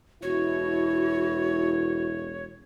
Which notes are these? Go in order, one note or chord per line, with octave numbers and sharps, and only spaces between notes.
E1 B2 E4 F#4 C#5